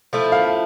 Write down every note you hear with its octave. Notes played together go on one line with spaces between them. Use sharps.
F3 A3 E4
F5